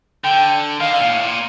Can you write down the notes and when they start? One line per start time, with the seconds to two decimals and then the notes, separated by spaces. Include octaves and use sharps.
0.24 D3 G5
0.80 D#3 F5
0.90 D3
0.99 A#2
1.09 A2
1.23 A#2